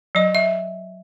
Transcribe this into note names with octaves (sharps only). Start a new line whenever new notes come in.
F#3 D#5
E5